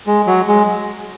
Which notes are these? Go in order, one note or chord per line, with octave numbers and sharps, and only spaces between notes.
G#3
F#3
G#3